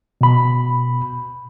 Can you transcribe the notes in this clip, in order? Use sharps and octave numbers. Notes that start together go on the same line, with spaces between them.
B2 B5